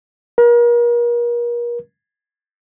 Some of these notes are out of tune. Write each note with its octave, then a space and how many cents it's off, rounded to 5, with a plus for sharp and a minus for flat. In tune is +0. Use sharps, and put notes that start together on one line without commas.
A#4 +40